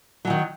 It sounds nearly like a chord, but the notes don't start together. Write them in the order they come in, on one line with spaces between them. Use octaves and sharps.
F#3 E3 D#3